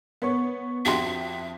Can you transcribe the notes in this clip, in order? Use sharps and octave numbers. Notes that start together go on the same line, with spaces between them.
B3 C#5 C#6
F2 F#4 G4 E5 C6